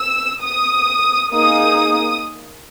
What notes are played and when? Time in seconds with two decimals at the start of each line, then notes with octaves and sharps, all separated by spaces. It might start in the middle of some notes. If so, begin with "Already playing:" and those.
Already playing: E6
0.42 D#6
1.32 A#3 D#4 G#4 D#6